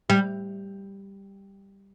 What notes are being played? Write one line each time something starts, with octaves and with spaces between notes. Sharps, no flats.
G3